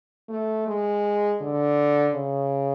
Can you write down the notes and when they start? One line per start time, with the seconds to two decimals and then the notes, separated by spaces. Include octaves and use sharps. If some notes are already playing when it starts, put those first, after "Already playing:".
0.29 A3
0.67 G#3
1.41 D3
2.14 C#3